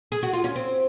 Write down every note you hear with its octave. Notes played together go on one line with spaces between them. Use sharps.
G#4
F#4
F4
C#4
C4